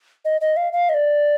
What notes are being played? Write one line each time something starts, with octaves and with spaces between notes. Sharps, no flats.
D#5
D#5
F5
F5
D#5
D5